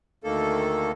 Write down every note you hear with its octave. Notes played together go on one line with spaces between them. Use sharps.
D2 D#3 A#3 A4